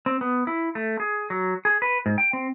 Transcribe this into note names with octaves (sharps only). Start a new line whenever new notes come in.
C4
B3
E4
A3
G#4
F#3
G#4
B4
G#2
G5
C4